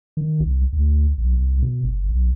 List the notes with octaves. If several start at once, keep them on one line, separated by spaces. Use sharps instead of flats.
D#3
C2
D2
B1
C2
B2
F#1
B1